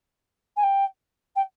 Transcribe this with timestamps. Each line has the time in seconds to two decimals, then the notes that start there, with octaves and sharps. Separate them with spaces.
0.56 G#5
0.62 G5
1.35 G5